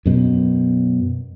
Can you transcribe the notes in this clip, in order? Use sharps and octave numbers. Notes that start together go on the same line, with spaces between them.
F#2 B2